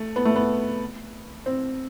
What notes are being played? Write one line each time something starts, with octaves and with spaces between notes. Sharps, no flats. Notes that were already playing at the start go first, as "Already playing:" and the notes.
Already playing: A3
B3
A3
B3
C4